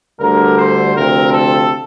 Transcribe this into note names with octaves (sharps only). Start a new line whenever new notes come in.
D2 D3 G3 A#4
C5
D2 C3 F3 C4 A#4
A4